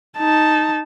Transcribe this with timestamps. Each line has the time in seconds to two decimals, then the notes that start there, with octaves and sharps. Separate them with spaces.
0.17 D#4 A5